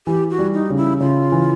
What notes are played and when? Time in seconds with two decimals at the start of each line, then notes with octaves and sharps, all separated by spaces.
0.07 E3 G4
0.31 F#4
0.39 G3
0.54 D#4
0.70 C#3
0.77 E4
1.00 C#3 F4
1.32 E3